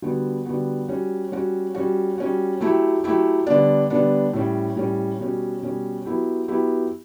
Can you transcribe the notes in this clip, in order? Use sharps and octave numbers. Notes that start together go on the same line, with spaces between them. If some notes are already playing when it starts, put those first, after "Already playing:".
D3 G3 B3 F#4
D3 G3 B3 F#4
G3 C#4 F#4
G3 C#4 F#4
G3 C#4 F#4
G3 C#4 F#4
F#3 A3 E4 G4
F#3 A3 E4 G4
D3 G3 B3 D4
D3 G3 B3 D4
A2 G3 C#4
A2 G3 C#4
B2 G3 C#4
B2 G3 C#4
F#3 B3 E4 G4
F#3 B3 E4 G4